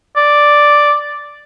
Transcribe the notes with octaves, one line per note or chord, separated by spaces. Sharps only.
D5